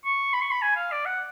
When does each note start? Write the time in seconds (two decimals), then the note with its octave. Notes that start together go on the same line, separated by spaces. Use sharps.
0.05 C#6
0.33 B5
0.41 C#6
0.51 B5
0.62 G#5
0.76 F5
0.92 D5
1.05 F#5